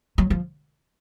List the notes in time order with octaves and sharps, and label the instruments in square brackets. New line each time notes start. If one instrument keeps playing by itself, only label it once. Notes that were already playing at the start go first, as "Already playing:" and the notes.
[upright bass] F#3
F3